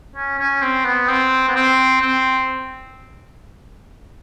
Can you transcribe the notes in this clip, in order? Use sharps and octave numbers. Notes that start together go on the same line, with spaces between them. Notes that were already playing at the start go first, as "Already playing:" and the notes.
C#4
C#4
C4
B3
C4
B3
C4
C4